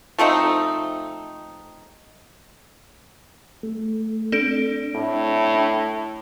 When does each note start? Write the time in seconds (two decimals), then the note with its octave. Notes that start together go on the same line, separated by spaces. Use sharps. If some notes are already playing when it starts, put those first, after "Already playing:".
0.19 F3 A3 C4 D#4
3.63 A3
4.32 C4 D4 A4 D7
4.95 A2